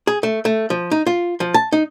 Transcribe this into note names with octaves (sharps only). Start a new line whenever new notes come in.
G#4
A3
A3
F3
D#4
F4
F3
A5
D#4